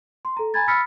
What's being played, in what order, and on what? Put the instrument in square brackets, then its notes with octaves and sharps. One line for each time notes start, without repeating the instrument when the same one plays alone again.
[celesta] C6
A4 A#5
G#5 A#5 B5 G#6 A6
B5 E6 F6 A6 B6 C#7